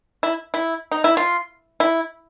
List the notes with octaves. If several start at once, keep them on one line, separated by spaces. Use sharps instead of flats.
E4
E4
D#4
E4
F4
E4